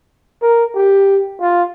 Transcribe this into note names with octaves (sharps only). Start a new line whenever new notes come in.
A#4
G4
F4